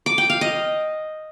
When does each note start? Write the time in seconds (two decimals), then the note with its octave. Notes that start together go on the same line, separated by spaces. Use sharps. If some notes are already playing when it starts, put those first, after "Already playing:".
0.06 D6
0.18 G5
0.30 F5
0.41 D#5